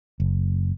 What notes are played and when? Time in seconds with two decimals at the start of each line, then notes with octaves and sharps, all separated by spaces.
0.20 F#1